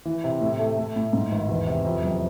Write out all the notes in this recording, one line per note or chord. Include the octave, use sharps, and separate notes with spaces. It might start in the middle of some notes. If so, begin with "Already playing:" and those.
E3
C3
A2
A3
A3
A2
G#2
G#1
E2
C3
F2
F#1